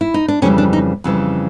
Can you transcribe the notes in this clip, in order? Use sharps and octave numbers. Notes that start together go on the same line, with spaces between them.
E4
D#4
D4
F2 C#3 E3 G3 C#4
D4
D#4
F2 C#3 E3 G3